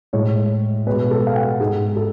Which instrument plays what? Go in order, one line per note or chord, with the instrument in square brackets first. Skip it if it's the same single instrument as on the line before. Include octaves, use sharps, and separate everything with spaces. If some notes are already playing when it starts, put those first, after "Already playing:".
[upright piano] A2 G#3 C#5
B2 B4
G#3
A4
F5
F#5
G#2 G#3 G#4
A4